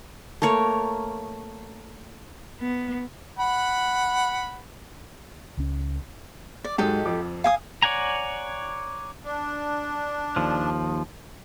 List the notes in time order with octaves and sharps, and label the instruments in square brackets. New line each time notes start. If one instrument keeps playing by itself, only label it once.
[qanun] A3 A#3 A#4 C#5
[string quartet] B3
[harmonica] F#5 B5
[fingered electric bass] C#2 C#4
[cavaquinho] D5
[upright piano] G#2 F#3 G#3 [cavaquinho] G4 A4 D#5
[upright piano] F2 F3 D6
[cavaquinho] F5 G#5 D#6
[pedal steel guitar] C#5 D5 F#5 G#5 A#5
[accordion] D4
[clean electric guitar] D#2 F3